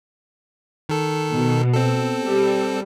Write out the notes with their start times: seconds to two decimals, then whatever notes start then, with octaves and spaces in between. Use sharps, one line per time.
0.89 D#3 A4
1.32 B2
1.73 C4 A4
2.25 G3